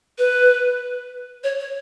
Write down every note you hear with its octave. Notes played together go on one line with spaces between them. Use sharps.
B4
C#5
C#5